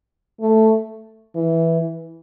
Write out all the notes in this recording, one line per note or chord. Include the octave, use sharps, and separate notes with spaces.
A3
E3